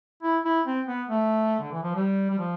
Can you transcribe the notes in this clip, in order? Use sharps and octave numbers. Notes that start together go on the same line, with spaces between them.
E4
E4
C4
B3
A3
D3
E3
F3
G3
G3
F3